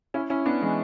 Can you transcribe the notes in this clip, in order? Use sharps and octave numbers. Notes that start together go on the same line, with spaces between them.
C#4 E4
C#4 E4
B3 D4
E3 G#3